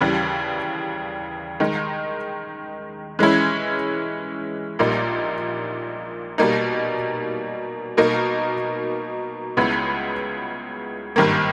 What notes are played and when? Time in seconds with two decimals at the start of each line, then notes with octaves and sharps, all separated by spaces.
0.01 D#2 C#3 E3 G3
1.60 D#3 G#3 D#4
3.19 E3 G#3 C#4 E4
4.79 A#1 A#2 G3 A#3 D#4
6.38 B2 G3 A#3 D#4
7.97 B2 A#3 D#4 A#4
9.57 C#2 C#3 G#3 B3 E4
11.16 G#1 G2 D#3 A#3